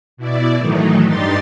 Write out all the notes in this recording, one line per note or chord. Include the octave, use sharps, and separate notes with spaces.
B2 E4 D5
A2 D#3 E3 F#3 A3 D#4
G2 D4 D#4 G4 C6 A6